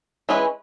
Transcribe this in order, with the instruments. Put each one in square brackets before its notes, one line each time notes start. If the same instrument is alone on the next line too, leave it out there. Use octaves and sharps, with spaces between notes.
[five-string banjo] E3 G#3 C#4 E4 B4